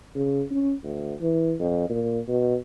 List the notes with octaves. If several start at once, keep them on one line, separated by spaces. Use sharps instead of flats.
C#3
C#4
D2
E3
F2
A#2
B2